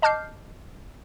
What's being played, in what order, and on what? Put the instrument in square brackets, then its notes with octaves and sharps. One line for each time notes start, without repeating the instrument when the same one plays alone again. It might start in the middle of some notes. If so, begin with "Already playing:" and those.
[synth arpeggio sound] D#5 A5 D6 F6 G6 C7